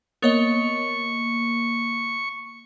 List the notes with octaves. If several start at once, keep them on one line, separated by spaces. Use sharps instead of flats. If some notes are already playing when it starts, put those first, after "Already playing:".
A#3 B3 C#5 D#5 C#6